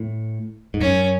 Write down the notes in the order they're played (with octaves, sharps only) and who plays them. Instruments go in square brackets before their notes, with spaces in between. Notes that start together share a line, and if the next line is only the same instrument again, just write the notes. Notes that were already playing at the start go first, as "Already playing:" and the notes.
Already playing: [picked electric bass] A2
G#2
[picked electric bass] F#2 [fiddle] C#4